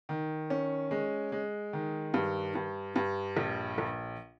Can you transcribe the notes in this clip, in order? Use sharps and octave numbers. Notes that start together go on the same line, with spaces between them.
D#3
C#4
G#3
G#3
D#3
G2
G2
G2
A#1
A#1